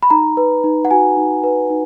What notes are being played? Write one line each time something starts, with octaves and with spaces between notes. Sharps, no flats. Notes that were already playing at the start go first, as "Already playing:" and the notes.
B5
D#4 A#5
B4
D#4
F#5
F#4 G#5
D#4
B4
D#4